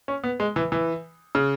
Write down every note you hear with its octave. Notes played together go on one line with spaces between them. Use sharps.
C#4
B3
G#3
E3
E3
C#3